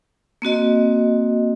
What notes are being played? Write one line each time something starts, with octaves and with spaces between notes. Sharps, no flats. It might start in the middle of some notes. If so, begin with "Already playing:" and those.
A#3 C4 F#4 D#5